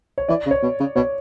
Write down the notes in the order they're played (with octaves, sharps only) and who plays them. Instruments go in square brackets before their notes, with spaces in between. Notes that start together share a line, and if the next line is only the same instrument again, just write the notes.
[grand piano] C#5
[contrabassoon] E3 [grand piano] D5
[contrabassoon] C#3
[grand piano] C#5
[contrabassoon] B2
C#3
[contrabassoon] B2 [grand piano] C#5